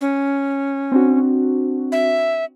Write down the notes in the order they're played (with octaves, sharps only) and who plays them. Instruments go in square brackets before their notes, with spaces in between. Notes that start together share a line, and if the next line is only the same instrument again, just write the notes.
[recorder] C#4
[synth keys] C4 D4 F#4
[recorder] E5